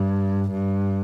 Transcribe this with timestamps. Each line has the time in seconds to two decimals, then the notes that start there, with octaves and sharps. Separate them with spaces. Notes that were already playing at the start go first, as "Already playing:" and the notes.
Already playing: G2
0.52 G2